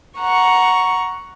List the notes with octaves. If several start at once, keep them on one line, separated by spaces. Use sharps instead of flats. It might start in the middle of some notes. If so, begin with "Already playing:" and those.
F#5 A#5 C#6